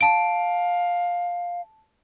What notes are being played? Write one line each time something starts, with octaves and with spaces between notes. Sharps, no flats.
F5 A5 D7